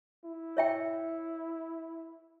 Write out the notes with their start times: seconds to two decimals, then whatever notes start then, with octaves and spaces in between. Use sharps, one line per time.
0.24 E4
0.57 C#5 E5 G5